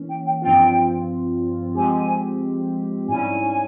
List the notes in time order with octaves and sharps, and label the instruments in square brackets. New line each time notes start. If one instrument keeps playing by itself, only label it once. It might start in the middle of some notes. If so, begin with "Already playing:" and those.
Already playing: [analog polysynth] E3 A#3 C#4
[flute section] G5
G5
[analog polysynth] G2 F3 C4 F4 [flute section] G5
[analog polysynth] F3 G#3 C4 G4 [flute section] G#5
[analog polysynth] G#2 G3 C#4 E4 [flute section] G#5